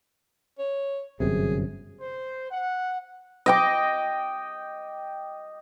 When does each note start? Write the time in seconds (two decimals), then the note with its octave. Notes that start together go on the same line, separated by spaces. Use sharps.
0.59 C#5
1.20 G1 F#2 C3 G#4
2.01 C5
2.51 F#5
3.46 D#5 G5 D6